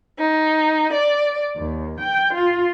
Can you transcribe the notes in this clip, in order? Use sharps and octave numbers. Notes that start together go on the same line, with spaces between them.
D#4
D5
D#2
G5
F4